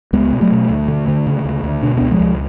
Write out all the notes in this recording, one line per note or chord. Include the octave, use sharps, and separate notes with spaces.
C#2 G#3 B3
B2
F#3 A3
B2
D2
D3
D3
C#3
D2
D2
B2 D4
C#2 B3 D4
F3 G#3
C#2